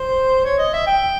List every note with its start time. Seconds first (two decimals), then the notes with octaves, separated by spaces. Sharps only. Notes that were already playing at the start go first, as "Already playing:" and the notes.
Already playing: C5
0.45 C#5
0.59 D#5
0.73 E5
0.87 G5